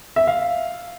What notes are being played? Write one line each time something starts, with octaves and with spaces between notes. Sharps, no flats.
E5
F5